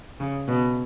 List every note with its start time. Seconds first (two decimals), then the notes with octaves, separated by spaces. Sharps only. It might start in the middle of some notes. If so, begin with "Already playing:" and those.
0.20 C#3
0.48 B2